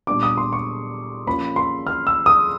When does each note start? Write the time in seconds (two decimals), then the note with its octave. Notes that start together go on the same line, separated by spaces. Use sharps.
0.07 A#2 G3 B3 D4 D6
0.23 D#6
0.38 C6
0.53 C#6
1.27 F3 A#3 C#4 B5
1.56 C6
1.87 F6
2.07 E6
2.26 D#6